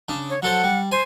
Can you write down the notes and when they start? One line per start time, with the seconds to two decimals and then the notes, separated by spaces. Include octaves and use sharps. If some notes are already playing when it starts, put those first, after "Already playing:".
0.09 C#3 D4
0.30 C#5
0.43 F#3 A4 C5 F#5
0.63 G3
0.92 C5 G#5